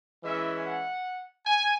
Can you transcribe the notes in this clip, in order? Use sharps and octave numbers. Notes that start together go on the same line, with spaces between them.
E3 G#3 C#4 E4 E5
F#5
G#5